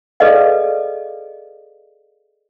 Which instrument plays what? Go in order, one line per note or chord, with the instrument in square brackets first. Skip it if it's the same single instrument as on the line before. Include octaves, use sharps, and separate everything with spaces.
[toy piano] G#4 A4 B4 D5 D#5 F5